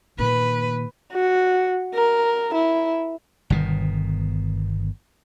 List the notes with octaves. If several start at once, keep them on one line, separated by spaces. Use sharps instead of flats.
A#2 D#3 B4
F#4
A#4
E4
G1 B2 D#3